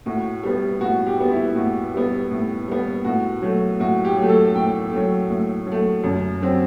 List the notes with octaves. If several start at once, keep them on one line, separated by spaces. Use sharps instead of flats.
A2 F#4
G3 B3
A2 F#4
G4
G3 B3
E4
A2 F#4
G3 B3
A2
G3 B3
A2 F#4
F#3 A3
A2 F#4
G4
F#3
A3
A4
A2 G5
A3
F#3
A2
F#3
A3
F#2
F#3 C4